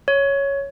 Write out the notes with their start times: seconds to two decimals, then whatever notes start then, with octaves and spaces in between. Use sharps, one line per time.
0.08 C#5